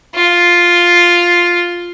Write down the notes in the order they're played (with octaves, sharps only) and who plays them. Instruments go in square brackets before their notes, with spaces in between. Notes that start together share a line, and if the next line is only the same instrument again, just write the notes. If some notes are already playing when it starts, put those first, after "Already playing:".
[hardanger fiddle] F4